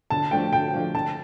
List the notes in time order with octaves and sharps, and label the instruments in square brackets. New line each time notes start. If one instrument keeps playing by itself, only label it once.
[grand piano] D3 [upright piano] A5
[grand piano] F3 A3 D4 F4 [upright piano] G5
[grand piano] D3 [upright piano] G5
[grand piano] F3 A3 D4 F4
[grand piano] D3 [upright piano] A5